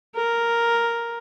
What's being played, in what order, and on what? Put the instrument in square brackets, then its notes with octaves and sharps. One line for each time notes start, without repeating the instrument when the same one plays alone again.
[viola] A#4